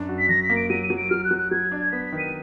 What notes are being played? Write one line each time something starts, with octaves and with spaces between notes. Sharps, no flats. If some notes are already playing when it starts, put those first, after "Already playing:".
Already playing: F#2 D4
F#4
B6
F#2 A#6
B6
A#3
D7
F#3 D#7
D#7
F#3
D7
F#3 F6
F#6
F#3
F#6
F#3 G#6
D4
B3 B6
B6
D#3
D#7